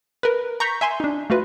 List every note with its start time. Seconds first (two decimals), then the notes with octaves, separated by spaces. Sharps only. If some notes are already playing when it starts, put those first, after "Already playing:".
0.23 A#4 B4
0.60 A#5 C#6 G6 B6
0.81 E5 G#5 C6
1.00 D4 D#4
1.30 A3 F4 F#4 B4